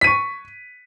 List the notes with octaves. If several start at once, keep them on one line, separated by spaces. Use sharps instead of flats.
C#6 B6 D#7